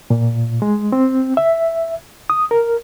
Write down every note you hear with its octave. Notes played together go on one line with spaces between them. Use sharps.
A#2
G#3
C4
E5
D#6
A#4